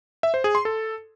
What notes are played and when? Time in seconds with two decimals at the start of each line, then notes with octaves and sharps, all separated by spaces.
0.23 E5
0.34 C5
0.44 G#4
0.55 C6
0.65 A4